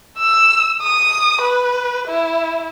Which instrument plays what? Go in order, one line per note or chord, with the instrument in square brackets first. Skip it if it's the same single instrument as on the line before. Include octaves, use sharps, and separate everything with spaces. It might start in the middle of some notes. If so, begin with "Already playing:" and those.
[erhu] E6
D#6
B4
E4